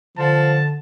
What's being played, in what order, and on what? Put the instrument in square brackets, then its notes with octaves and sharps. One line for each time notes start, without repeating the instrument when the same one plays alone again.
[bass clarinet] D3 [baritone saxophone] F3 [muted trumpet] A5